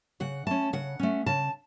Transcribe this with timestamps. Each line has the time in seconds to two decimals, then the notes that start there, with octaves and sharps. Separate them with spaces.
0.20 C#3 F#5
0.47 A3 C#4 A5
0.73 C#3 F#5
1.00 A3 C#4
1.26 C#3 A5